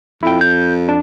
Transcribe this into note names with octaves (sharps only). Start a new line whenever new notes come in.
F2 E4 G5
G6
D4